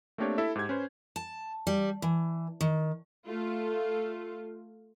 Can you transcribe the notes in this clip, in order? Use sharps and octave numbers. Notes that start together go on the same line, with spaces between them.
A3 A#3 C4 D4 G4 C#5
E4 A4 E5
G#2 G4 G#6
C#4 B4 C5
A5
G3
E3
D#3
A3 F4